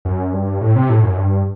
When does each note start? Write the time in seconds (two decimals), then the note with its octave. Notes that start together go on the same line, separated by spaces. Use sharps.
0.05 F#2
0.33 G2
0.61 A2
0.75 C3
0.90 A2
1.03 F#2
1.17 G2